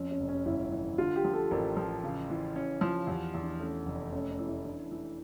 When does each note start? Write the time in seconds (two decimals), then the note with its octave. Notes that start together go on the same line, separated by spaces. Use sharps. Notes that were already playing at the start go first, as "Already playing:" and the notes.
Already playing: F2 C#4
0.11 C#4
0.20 F1
0.29 C#4
0.46 G1 E4
0.72 E3
0.98 D3 F4
1.16 G4
1.24 F3
1.33 A4
1.51 A1 A#4
1.76 F3 A#4
2.03 C#3
2.30 E3
2.56 C#4
2.81 F3
3.07 E2 G4
3.34 E2
3.43 D4
3.60 A3 C#4
3.86 F1
4.12 A3 C#4
4.30 C#4
4.39 E3
4.47 E4
4.64 E3 D4
4.91 E3